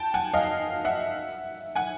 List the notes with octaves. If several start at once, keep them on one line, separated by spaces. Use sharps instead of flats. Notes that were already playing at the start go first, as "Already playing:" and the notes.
Already playing: G5 A5
F#5 G#5
D#5 F5
E5 F#5
F#5 G#5